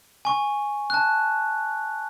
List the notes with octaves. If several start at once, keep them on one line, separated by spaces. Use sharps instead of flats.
G#5 C#6
A5 F#6